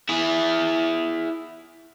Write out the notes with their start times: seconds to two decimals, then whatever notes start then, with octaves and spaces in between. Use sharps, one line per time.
0.09 E4 G#4